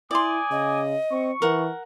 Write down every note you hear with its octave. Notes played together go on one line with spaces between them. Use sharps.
E4 D5 G#5 C6 D6 D#6
C#3 D#5
C4 C#6
E3 A#4 F#5